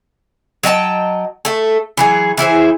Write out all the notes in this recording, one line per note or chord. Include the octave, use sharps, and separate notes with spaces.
F#3 D#5 G5 A5
A3 A4
E3 F#3 G#4
E3 E4 G#4 C5